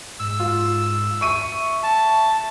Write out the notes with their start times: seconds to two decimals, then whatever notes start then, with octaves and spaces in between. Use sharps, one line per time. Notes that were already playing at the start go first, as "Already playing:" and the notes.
0.19 G#2 E6
0.40 F4
1.21 E5 C#6 D#7
1.83 A5